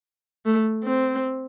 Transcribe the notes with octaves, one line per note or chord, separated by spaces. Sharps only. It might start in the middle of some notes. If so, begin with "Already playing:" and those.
A3
C4